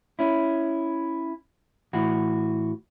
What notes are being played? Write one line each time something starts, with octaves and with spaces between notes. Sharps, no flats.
C#4 E4
A2 E3 F#4